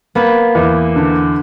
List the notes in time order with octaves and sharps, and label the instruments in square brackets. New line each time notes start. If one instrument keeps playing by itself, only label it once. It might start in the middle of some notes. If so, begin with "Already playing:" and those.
[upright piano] A#3 [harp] B3 B4
[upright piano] E2
D3